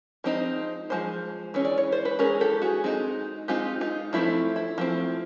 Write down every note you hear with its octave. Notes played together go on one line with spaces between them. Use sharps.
F3 G#3 C4 D#4
F3 G#3 C5
E3 G#3 C#4
D5
C#5
C5
B4
E3 G#3 C#4 G#4 A#4
G4 A4
F#4 G#4
G#3 C4 D#4
G#3 C4 D#4 F4 G4
D#4 F4
F3 A3 C4 E4
E4
F3 A3 C4